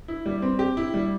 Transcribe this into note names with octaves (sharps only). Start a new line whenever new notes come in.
E4
G3
C4
G4
E4
G3